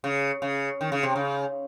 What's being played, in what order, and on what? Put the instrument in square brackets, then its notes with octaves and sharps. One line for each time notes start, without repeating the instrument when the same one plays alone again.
[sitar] C#3
C#3
D#3
C#3
C3
C#3